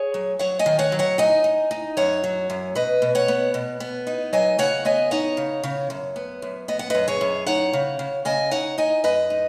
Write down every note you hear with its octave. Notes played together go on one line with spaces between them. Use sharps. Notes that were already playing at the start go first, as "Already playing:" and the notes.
Already playing: G#4 C#5
F#3
F#3 C#5 F#5
D#5 G#5
D#3
C#5 F#5
F#3
C#5 F#5
D#4 D#5 G#5
D#4
D#4
F#2 C#5 F#5
F#3
F#2
B2 B4 D#5
B2
C#5 F#5
B3
B2
B3
D#4
F#3 D#5 G#5
C#3 C#5 F#5
B3 D#5 G#5
D#4 C#5 F#5
C#3
C#3
F#2
B3
F#2
B3 D#5
F#5
F#2 B4 D#5
G#4 C#5
F#2
D#4 C#5 F#5
C#3
C#3
C#3 D#5 G#5
D#4 C#5 F#5
D#4 D#5 G#5
F#2 B4 D#5
D#4